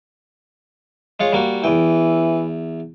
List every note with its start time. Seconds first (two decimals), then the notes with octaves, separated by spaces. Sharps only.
1.20 G#3 F4 C#5
1.33 G3 A#3 F#4
1.64 E2 E3 G5